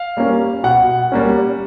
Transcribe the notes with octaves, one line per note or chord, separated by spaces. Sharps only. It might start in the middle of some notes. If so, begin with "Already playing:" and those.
Already playing: F5
G3 A#3 C#4
B2 F#5
G3 A#3 C#4